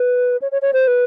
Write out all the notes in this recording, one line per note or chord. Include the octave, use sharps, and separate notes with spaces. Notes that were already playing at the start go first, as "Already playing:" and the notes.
Already playing: B4
C#5
C#5
C#5
C5
B4